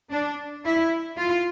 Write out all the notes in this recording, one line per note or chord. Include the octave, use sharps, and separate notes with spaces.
D4
E4
F4